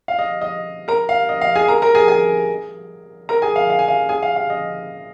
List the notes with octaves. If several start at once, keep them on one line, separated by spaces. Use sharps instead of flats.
F5
D#5
D#5
A#4 A#5
F5
D#5
F5
G#4 G#5
A#4 A#5
A#4 A#5
G#4 G#5
G#4 G#5
A#4 A#5
G#4 G#5
F5
F5
G#5
F5
G#4 G#5
F5
F5
D#5